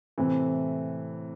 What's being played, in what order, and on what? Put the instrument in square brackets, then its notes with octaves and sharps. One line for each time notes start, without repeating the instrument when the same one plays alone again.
[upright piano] A2 A3 C4 A4 [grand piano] C3 E3